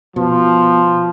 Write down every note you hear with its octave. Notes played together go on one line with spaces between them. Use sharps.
B2 F3